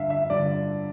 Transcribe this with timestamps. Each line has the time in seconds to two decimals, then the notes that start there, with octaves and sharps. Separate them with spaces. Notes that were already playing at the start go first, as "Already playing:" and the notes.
Already playing: G2 D3 E5 F5
0.10 E5
0.30 G2 D3 D5